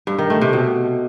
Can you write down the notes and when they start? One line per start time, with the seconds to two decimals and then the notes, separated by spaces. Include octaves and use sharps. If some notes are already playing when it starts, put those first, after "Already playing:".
0.07 G2
0.19 D#3
0.30 A3
0.42 C3
0.53 B2